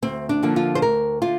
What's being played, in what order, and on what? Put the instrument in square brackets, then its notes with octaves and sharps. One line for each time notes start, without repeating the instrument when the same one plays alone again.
[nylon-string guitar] D2 C4
D4
D3 F3 A#3
F4
C5
D2 A#4
D3 F4